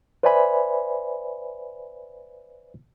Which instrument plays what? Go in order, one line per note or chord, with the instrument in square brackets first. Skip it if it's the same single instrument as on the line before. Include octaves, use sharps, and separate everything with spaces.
[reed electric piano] B4 C5 D5 E5 G#5 B5